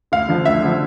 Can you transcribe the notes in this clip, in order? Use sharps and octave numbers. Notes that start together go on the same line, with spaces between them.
D2 F5
D3 F3
D2 E5
D3 F3